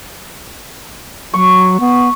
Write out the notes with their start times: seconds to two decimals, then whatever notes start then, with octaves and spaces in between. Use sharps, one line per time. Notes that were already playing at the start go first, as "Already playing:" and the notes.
1.34 F#3 C#6
1.80 B3